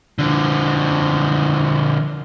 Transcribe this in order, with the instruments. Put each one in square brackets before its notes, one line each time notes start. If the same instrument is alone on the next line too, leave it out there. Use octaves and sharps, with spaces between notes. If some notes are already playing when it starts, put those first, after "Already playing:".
[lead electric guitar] D3 F3